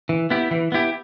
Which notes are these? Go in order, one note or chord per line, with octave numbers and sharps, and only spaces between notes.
E3
B3 E4 G4
E3
B3 E4 G4